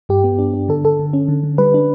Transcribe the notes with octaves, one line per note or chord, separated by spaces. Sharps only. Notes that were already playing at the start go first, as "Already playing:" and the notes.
G2 G4
B3
D4
D4
D3 A4
D3 A4
D3
C#4
D3
D3
G3 B4
D4